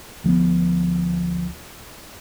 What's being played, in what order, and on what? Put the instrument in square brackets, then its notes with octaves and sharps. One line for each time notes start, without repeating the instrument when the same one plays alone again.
[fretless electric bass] D2 F3 A#3 B3